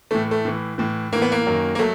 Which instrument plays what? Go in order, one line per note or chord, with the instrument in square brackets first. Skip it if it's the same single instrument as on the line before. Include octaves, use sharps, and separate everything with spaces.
[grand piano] A2 E3 A3
A3
A2 E3
A2 E3
A2 E3 A#3
B3
A#3
F#2 D#3 F#3
A#3
F#3 A3